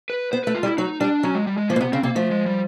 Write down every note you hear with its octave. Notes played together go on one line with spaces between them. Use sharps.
B4
B3 C5
A3 B4
F4
G3
E4
F#3 D#4
G3 D4
F#3 C#4
G#3
G3
G#3
F3 A#3
B2
C3 B3
C#3 C4
C3 A#3
F3 A3
G#3
G3